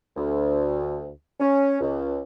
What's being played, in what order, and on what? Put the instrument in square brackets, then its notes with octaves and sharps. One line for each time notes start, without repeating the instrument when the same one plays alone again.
[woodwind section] D2
C#4
C#2